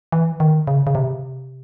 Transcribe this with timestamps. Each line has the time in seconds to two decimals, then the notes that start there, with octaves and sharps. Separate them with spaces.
0.12 E3
0.40 D#3
0.67 C#3
0.87 C#3
0.95 C3